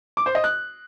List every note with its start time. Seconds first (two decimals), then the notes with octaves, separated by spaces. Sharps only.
0.17 D6
0.26 C5
0.35 D#5
0.44 F#6